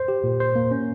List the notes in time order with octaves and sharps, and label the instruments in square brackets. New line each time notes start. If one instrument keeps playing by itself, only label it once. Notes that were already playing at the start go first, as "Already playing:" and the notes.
Already playing: [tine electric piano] C5
G4
A#2
C5
A#3
C#4